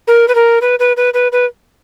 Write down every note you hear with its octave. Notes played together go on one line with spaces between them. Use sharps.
A#4
B4
A#4
B4
B4
B4
B4
B4